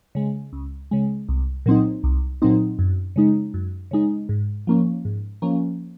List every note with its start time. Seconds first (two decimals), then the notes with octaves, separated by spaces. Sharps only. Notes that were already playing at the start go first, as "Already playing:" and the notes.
0.15 C#3 G#3
0.53 C#2
0.91 C#3 G#3
1.29 C2
1.66 A#2 F#3 C4 D#4
2.04 C2
2.42 A#2 F#3 C4 D#4
2.79 F#2
3.16 C#3 G#3 D#4
3.54 F#2
3.91 C#3 G#3 D#4
4.29 G#2
4.67 F3 A#3 C#4
5.05 G#2
5.42 F3 A#3 C#4